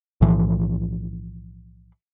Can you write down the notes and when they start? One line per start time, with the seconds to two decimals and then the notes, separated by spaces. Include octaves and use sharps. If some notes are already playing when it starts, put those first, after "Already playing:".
0.21 B1 A2 E3 F3